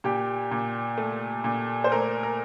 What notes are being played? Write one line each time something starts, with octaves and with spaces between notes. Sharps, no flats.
A#2 G4
A#2
A3
A#2
C5
A3 A#4
A#4